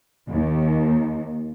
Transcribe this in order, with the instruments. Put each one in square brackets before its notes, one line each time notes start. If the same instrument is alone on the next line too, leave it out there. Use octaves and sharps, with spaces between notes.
[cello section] D#2